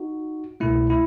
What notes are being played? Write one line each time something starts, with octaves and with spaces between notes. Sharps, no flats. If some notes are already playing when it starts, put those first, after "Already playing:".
Already playing: D#4 F#4
C2 B2 A3 E4
E4